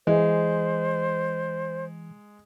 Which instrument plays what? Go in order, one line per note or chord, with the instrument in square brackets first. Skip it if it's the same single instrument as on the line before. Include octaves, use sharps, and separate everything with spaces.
[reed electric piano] E3 [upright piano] G#3 [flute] C5